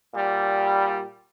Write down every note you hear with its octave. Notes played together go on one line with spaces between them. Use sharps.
A#2 G3